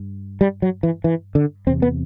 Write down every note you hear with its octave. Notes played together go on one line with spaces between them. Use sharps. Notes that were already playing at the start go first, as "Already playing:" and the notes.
Already playing: G2
G3
F#3
E3
E3
D3
E2 C3 C4
B3